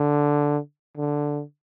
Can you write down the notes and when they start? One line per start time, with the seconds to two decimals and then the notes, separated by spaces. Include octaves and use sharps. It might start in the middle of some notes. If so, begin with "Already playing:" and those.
Already playing: D3
0.97 D3